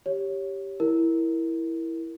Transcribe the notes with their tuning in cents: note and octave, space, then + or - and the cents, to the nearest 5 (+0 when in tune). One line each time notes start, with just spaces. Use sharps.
G4 +0 C#5 +0
E4 +0 A#4 +0